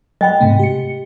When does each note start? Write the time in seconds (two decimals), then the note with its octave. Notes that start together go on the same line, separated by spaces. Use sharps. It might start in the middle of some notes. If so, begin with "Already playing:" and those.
0.21 F#3 D#5 F#5 G5 B5
0.40 G#2 C3 A3
0.59 G4 C#7